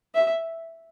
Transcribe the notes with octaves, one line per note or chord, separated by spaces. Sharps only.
E5